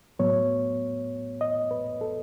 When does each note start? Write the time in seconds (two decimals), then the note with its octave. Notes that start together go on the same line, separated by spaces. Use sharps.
0.19 A2 F#3 B3 C#5
1.41 D#5
1.71 B4
2.01 A4